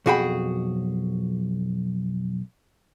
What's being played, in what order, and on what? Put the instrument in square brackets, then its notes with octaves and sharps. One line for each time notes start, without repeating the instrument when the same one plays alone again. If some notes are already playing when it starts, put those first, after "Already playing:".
[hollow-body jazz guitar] B1 F2 F#4 G#4 G5 B5